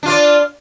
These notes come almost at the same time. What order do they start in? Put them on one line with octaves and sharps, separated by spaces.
D4 F4 D5